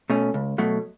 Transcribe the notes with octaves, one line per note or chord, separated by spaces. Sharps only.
B2 A3 C#4
C#2
B2 F#3 A3